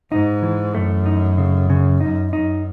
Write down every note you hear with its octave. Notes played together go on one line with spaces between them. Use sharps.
G#2 D#4
E3
F#2 A3
D#4
C#3
C#3
F#2 D#4
F#2 D#4